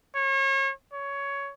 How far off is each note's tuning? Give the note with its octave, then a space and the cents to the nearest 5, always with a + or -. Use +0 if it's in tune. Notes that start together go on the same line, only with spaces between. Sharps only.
C#5 -35
C#5 +15